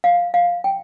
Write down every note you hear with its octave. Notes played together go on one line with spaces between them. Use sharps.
F5
F5
G5